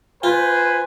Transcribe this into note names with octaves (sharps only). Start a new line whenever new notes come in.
F4 B4 C5 G#5